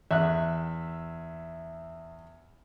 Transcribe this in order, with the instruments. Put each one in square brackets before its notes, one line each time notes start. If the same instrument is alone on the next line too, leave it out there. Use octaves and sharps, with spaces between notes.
[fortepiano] E2 F#6 [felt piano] E5